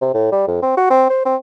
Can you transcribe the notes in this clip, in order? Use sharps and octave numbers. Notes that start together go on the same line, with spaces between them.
C3
A2
G3
F2
C4
F#4
C4
C5
C4